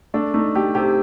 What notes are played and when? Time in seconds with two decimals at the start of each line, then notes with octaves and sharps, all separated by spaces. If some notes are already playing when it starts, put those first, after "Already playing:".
0.14 A3 D4
0.34 A3 D#4
0.55 A3 G4
0.75 C3 G4